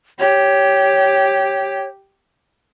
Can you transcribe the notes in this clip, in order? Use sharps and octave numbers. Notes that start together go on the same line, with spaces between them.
G4 C#5